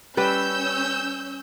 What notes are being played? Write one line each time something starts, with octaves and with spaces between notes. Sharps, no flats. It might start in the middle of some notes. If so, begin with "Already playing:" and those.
G3 C#4 B4 E6 G6